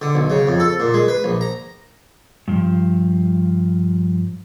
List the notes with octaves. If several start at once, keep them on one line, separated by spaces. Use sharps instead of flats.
D3
B1
C#3
F2
A4
A#2
G#3
B4
A#1
A#5
G2 F3